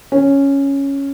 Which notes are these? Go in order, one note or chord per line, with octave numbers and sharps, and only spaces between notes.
C#4